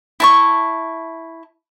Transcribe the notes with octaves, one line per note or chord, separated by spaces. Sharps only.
E4 A5 C#6